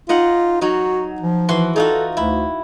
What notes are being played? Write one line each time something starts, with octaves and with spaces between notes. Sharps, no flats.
D#4 F4 D#5 F#5
F#3 D#4 F#4
F3
E3 F#4 C6
D#4 F4 F#4 A4
D2 E4